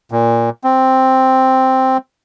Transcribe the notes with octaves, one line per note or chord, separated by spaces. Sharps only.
A#2
C4